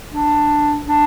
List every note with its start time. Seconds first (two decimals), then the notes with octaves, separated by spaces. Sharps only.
0.11 D4
0.86 D4